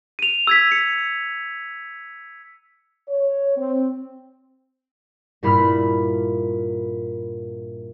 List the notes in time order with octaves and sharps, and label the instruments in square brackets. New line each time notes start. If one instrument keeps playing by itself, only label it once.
[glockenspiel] D#7 F7
E6 G#6 B6
C#7
[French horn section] C#5
C4
[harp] G2 A#2 E4 B5 F6